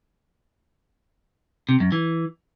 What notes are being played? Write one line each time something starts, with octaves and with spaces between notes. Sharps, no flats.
C3
F#2
E3